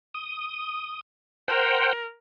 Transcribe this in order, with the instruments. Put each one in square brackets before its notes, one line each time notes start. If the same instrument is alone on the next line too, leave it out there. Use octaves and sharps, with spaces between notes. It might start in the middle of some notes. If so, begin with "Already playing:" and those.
[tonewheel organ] D#6
[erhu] A#4 [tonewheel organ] C5 F#5 G5